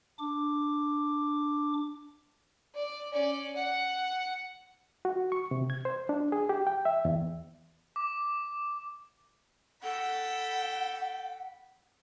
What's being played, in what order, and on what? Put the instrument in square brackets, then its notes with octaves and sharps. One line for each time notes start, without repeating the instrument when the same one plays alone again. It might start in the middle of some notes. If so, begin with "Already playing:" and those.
[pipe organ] D4 D6
[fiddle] D5
C#4 D5
F#5
[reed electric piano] F#4
C#6
C3
G#6
C5
D4
G#4
G4
G5
E5
E2
[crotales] D6
[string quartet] A4 G5 B5 [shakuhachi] F#5